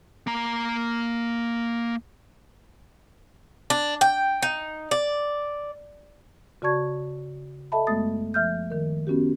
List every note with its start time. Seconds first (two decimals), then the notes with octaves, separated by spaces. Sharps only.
0.27 A#3 A#5
3.70 D4
4.01 G5
4.42 D#4
4.91 D5
6.62 C#3 F#4 D5 A5 C#6 G#6
7.72 A4 D#5 E5 A5 B5
7.87 F#2 G#3 A3 B3 D#6 A6
8.34 F3 E5 F6 G6
8.70 D#3 A#4
9.07 B3 C#4 F#4 G4